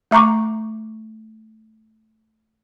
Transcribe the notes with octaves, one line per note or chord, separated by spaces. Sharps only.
A3 E5 A#5 C#6 D6